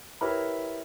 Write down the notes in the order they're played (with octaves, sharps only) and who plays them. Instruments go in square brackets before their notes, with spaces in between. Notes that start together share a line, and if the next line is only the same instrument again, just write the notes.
[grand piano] E4 G4 A#4 B4 C#5 B5